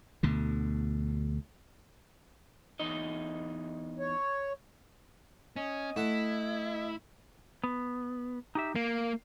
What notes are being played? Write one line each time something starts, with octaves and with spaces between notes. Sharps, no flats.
D2 B2 D3
E2 D#4 D#5
C#5
C#4 D#5
A3 E4 F#5
B3
D#4 G4 E5
A#3 F5